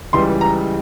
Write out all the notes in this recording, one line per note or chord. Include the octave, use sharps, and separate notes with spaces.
C#2 C#3 E3 G3 C6
A#5